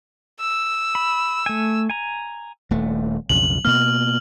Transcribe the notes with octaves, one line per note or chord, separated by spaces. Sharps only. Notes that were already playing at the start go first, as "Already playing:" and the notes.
E6
B5
A3 G#5
G#5 A#5
D#1 A3
B1 F2 C#3 F#7
B2 A#3 F6 F#7